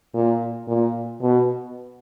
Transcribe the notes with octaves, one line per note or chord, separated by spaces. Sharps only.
A#2
A#2
B2